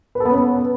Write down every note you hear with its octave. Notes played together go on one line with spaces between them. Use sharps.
B4
A4
B3
C#4
B3